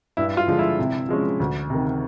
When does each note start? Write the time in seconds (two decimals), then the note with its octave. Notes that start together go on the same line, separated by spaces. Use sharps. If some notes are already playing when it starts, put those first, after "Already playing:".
0.17 G2 E4
0.37 F4
0.48 D3 F3 G#3
0.59 E4
0.79 C3
1.09 F3 G#3 C#4
1.40 D2
1.70 C3 D#3